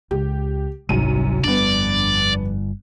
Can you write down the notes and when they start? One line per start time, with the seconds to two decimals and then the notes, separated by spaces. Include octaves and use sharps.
0.11 C#2 G4
0.89 G#1 C#2 F#2 C3 G3 D#7
1.44 G1 F2 G3 B3 D4 D5